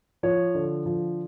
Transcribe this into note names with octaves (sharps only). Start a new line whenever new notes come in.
F3 C#5
D3
F3